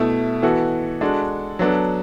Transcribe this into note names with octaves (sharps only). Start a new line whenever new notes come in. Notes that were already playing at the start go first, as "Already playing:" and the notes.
Already playing: B2 A3 E4
E3 B3 F#4 A4
G#3 D4 F#4 A4
F#3 B3 D4 A4